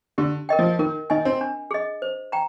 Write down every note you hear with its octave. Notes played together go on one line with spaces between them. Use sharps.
D3 G4
A#4 D#5 G5
F3
D#3 A#4
D#3 D#5 G#5
C4
D4
G#4 D#5
C5
G5 A#5